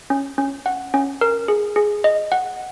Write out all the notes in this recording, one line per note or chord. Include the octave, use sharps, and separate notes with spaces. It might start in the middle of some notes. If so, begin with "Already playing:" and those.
C#4
C#4
F#5
C#4
A#4
G#4
G#4
D#5
F#5